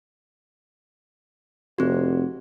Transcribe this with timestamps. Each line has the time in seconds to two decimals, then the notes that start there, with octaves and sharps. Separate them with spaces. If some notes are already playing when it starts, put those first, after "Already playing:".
1.78 F1 C4 F#4